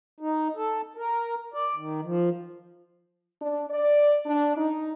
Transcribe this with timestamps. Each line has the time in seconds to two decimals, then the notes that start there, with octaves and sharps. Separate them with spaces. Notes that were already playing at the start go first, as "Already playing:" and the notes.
0.20 D#4
0.56 A4
0.97 A#4
1.54 D5
1.76 D#3
2.04 F3
3.41 D4
3.70 D5
4.26 D4
4.57 D#4